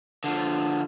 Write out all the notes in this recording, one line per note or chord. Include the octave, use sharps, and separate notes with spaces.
D3 F3